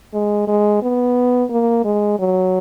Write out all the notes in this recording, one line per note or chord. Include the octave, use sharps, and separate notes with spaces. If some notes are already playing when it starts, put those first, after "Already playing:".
G#3
G#3
B3
A#3
G#3
F#3